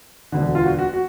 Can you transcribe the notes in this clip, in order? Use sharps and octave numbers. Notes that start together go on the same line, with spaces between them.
E1 D2 D3
F4
F#4
F#4
F#4